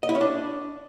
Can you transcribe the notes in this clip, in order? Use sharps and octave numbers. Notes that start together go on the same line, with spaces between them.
D#5
E4
C#4
D4